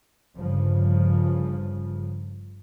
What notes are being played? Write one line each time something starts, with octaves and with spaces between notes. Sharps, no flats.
G1 G2 C#3 F3